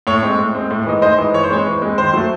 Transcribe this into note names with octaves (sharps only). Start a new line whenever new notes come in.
A2 C#5
G#3 C4
A2
G#3 C4
A2
E3 G#3 D#4
A2 C5 D#5
E3 G#3 D#4
E3 C#5
C5
G#3 C4 C#5
E3
G#3 C4
D#3 C5
F#3 A3